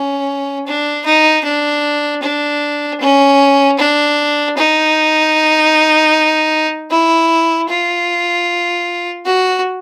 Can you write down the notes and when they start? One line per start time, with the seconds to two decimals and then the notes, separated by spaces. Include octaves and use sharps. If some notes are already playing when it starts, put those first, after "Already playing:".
Already playing: C#4
0.67 D4
1.05 D#4
1.44 D4
2.22 D4
3.00 C#4
3.78 D4
4.57 D#4
6.90 E4
7.69 F4
9.25 F#4